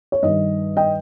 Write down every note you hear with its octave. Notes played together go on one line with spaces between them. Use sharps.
C#5
G2 D#3 D#5
D#5 G5